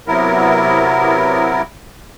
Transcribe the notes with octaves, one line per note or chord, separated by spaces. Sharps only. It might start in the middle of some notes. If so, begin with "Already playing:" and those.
C3 F#3 B3 E4 A#4